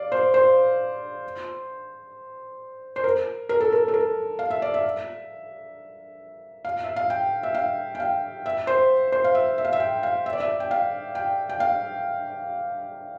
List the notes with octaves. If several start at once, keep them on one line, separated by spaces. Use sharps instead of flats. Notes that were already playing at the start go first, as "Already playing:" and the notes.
Already playing: D5 F5
C5
C5
C5
A#4
A#4
A4
A#4
A4
A#4
F5
E5
D5
E5
F5
E5
F5
G5
E5
F5
G5
F5
E5
C5
C5
F5
E5
E5
F5
E5
G5
F5
E5
D5
E5
G5
F5
G5
G5
F5